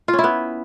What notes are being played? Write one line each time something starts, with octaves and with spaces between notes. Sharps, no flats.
F4
C#4
E4
B3